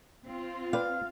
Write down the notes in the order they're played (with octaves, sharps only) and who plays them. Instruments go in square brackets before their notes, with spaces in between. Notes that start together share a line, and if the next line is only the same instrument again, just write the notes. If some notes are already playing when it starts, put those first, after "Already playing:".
[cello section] C4 F4
[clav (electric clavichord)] B4 D5 G5 [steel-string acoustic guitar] F5